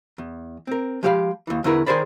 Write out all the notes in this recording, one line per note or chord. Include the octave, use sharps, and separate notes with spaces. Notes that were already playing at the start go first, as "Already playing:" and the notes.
E2
C4 A#4
F3 G#3 G4 C#5 F5 B5
D#2 E3
E2 D3 C#4 E4 A#4 B4
D#3 G#4 A#4 C5 D5 B5